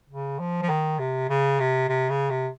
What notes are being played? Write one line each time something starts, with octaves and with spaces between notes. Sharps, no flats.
C#3
F3
F3
D#3
C3
C#3
C3
C3
C#3
C3